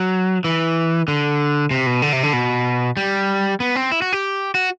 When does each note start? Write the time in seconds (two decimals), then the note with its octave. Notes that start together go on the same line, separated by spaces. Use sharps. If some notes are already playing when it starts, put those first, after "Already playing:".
Already playing: F#3
0.44 E3
1.08 D3
1.71 C3
1.86 B2
2.02 D3
2.13 C3
2.23 D3
2.33 B2
2.97 G3
3.60 B3
3.76 C4
3.92 E4
4.02 F#4
4.13 G4
4.55 F#4